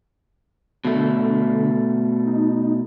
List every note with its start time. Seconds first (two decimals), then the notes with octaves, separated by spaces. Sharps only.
0.85 B2 D3 A3
2.25 D#4